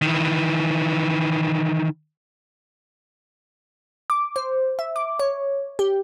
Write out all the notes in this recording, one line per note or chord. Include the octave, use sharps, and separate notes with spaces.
D#3 E3
D6
C5
E5
D6
C#5
G4